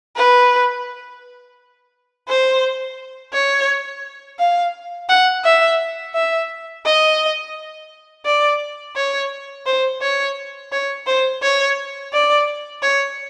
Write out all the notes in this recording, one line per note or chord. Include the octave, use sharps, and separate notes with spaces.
B4
C5
C#5
F5
F#5
E5
E5
D#5
D5
C#5
C5
C#5
C#5
C5
C#5
D5
C#5